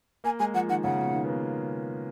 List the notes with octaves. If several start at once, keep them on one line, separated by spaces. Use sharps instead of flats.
A#3 G#5
G#3 G#5
F3 F#5
D#3 F#5
C#3 F#5
B2
D#3
B3
A#3